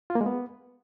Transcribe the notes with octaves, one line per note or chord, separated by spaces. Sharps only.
F4
A#3
G#3
B3